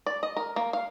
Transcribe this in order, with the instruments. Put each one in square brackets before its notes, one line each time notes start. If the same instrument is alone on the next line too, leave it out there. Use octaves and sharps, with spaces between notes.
[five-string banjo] D5
D#5
A#4
A#3
F5